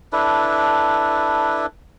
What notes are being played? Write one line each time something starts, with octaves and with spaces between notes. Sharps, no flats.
D4 E4 A4 B4